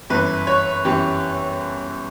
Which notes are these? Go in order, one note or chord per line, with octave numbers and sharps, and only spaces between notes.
G1 F#2 E3 B4
C#5
G1 F#2 E3 G4